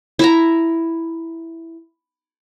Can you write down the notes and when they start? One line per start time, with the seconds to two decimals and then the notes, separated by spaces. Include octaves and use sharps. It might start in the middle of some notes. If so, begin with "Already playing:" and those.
0.19 E4 E5 A#5